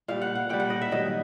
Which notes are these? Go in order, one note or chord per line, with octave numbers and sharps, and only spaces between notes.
A#2 G3 F5
F#5
F#5
A#2 G3 G5
F#5
D#5
E5
G2 D#3 F#3 D#5